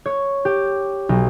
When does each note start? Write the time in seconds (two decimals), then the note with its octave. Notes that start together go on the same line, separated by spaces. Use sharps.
0.06 C#5
0.45 G4
1.09 B1